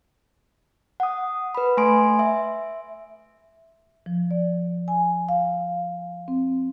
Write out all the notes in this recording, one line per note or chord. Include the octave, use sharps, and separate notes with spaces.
F#5 D#6
B4 B5
A3 G#5 C6 D7
E5
F3
D5
G#5
F5
C4